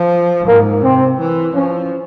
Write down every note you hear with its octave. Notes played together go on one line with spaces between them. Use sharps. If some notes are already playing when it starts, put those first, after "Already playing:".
Already playing: F3
G#2 A#3
C3 C4
E3
F3 C#4